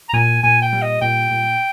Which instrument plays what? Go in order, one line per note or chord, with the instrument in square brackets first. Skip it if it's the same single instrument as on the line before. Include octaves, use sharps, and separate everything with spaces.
[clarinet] A#5
[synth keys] A#2 [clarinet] G#5
[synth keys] A#2 [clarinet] G#5
[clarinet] G5
[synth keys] G3
[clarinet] D#5
[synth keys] A#2 [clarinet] G5
[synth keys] A#2